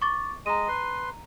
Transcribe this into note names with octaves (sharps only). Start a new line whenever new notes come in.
C#6 D6 A6
G#3 D#5 A#5 D#7
B4 C6